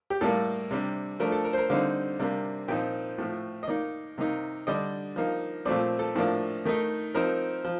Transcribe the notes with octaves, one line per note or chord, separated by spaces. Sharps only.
G4
A2 G3 A#3 A4
C3 G3 D4
F3 A3 D4 A#4
A4
A#4
C5
A#4
D3 G3 C4 D#4 F5
C3 G3 A#3 D4
A#2 F3 C4 D#4 G5
A2 F3 A3
D#5
D#3 A#3 D#4 D5
C3 D#3 A#3 D#4
D3 G3 D4 D#5
F3 A#3 D#4
A#2 F3 A3 C4 D5
A4
A2 F3 A#3 D4
D#3 A3 D#4
F3 C4 D#4 A#4
F3